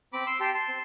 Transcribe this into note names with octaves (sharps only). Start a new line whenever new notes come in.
C4 B5 D6
C6 E6
G4 A5 C6
A5 C6
C4